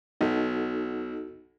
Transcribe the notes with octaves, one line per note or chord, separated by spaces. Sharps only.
B1 D#4 F#4 A4